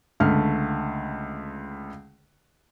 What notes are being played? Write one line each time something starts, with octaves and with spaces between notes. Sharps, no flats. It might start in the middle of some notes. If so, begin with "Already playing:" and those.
C#2 D3 A3 F6